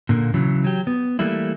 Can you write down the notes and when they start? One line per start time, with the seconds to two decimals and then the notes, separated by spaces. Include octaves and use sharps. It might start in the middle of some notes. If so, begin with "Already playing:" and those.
0.09 A#2 D3 A#3
0.34 C#3 E3 F#3
0.64 F#3 G4
0.87 B3
1.19 E3 G3 A3 A#3 E4